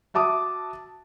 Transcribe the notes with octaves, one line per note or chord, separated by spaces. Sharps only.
F#4 E5 A5 D6 D#6